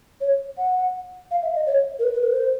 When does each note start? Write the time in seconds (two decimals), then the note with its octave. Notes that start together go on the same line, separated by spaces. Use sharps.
0.21 C#5
0.57 F#5
1.31 F5
1.42 E5
1.55 D#5
1.66 C#5
1.99 A#4
2.03 B4
2.13 B4
2.22 A#4
2.31 C5